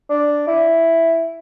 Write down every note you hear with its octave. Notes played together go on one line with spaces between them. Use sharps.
D4
E4